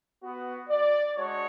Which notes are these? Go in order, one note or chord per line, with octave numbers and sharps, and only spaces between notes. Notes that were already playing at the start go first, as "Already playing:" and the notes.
B3 F#4
D5
G#3 D4 F#4 C#5